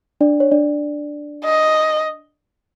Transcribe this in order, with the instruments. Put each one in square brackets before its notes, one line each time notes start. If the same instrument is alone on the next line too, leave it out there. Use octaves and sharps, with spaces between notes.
[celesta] D4 D5
C#5
D4 D5
[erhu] D#5